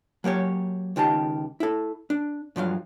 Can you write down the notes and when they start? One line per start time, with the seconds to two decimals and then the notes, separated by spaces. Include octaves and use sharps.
0.24 F#3 A#3 G4 C#5
0.96 C#2 D#3 G4 A5
1.60 E4 A4
2.10 D4
2.56 G2 F3 F#3 F5